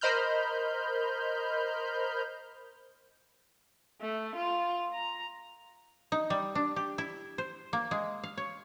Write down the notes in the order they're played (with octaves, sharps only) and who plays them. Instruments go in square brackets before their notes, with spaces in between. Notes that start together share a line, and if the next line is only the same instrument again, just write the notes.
[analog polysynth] A#4 C5 D#5 B5 F6 G6
[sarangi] A3
F4
A#5
[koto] D#4
G3
D4
G4
E4
C5
A#3
G#3
F5
C#5